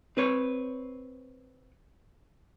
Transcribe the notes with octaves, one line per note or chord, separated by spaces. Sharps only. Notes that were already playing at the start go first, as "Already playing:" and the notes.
C4 B4 C#5